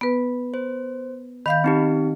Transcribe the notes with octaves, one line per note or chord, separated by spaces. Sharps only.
B3 B4
C5
D#3 F5 B5 G6
C4 D#4 G4